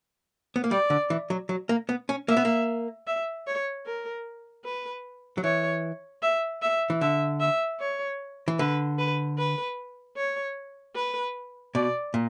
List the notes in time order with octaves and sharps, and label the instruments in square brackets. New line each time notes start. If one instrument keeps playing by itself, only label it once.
[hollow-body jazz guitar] B3
A#3
[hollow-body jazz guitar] G3 [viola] D5
[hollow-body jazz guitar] D3
E3
F#3
F#3
A#3
B3
C#4
[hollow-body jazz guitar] A#3 [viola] E5
[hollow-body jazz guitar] B3
A#3
[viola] E5
C#5
A#4
B4
[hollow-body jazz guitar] F#3
[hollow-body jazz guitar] E3 [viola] C#5
[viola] E5
E5
[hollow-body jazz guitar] E3
[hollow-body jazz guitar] D3 [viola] E5
[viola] E5
C#5
[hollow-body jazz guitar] E3
[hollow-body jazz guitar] D3 [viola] B4
[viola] B4
B4
C#5
B4
[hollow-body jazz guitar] B2 [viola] D5
[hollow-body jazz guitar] A#2